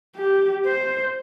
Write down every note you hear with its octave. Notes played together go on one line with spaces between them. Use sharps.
G4
C5